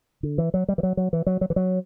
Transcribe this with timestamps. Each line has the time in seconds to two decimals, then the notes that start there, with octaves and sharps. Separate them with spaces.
0.23 D3
0.38 E3
0.54 F#3
0.68 G3
0.78 E3
0.83 F#3
0.97 F#3
1.13 E3
1.27 F#3
1.41 F#3
1.50 E3
1.56 F#3